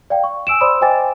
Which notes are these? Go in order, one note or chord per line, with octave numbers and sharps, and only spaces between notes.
D5 F5 G5
C#6
G#5 E6 D7 E7
C5 D5 B5 C6 D#6 E6
C5 D#5 G5 G#5 D6 A6